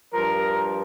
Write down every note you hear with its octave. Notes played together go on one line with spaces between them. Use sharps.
G2 F3 A#4